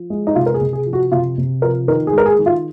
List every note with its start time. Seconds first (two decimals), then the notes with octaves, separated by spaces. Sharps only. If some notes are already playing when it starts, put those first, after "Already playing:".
Already playing: F3
0.10 G#3
0.27 D#4
0.35 C3 F4
0.46 A#4
0.54 G#4
0.61 C3
0.73 G#4
0.86 F3
0.93 F#4
1.12 C3 F4
1.38 C3
1.62 F3 A#4
1.88 D#3 A#4
2.07 G#4
2.13 G#3 A#4
2.26 G#4
2.39 D#3
2.46 F4